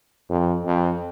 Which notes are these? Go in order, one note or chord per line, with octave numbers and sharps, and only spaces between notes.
F2
F2